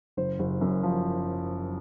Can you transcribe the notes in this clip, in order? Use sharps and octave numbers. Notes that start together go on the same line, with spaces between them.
F#1 C5
F#1
F#2
F3